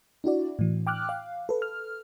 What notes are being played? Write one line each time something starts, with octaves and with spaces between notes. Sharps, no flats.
D4 E4 F#4 D5
A2 E3
G5 D6 F6 F#6
F5
A4 B4
F6